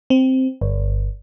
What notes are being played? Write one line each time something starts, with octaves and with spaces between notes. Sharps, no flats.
C4
G1